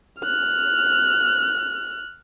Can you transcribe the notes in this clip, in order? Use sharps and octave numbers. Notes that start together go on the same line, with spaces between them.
F6 F#6